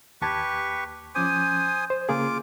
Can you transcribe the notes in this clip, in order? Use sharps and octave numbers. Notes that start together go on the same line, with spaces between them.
D#2 G4 B4 A5 C#6 G#6
F3 C#4 C5 G#5 D6 D#6
C5
C#3 A#3 F4 G#4 D6